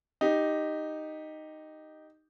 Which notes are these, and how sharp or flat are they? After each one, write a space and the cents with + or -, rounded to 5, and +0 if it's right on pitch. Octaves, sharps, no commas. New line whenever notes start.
D#4 -5 G4 +0